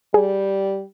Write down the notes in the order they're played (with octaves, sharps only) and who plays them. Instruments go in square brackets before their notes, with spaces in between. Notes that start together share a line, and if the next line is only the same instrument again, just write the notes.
[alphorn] G3 [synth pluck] G#4